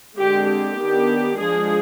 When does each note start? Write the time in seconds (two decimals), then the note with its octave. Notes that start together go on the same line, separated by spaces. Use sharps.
0.19 D3 G#3 C4 G4
0.49 G4
0.80 D#3 B3 D4
1.39 F3 G#3 D4 G#4